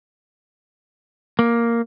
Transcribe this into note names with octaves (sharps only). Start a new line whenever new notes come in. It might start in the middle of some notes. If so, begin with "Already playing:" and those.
A#3